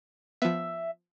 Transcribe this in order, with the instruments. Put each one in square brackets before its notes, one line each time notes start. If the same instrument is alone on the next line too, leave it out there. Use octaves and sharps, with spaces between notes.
[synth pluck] F3 B3 [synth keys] E5